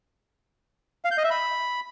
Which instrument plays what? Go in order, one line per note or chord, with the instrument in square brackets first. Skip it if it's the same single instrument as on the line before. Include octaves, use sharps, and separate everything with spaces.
[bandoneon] F5
G6
D#5
E5
B5